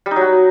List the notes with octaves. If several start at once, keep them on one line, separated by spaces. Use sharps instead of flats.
G3
D#4
F#3
F#4